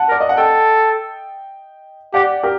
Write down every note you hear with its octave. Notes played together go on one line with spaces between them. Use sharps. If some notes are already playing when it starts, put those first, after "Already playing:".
Already playing: F#5 A5
A#4 D5
D#5
F#5
A4 D#5 G5
G4 D5 F#5
G4 A#4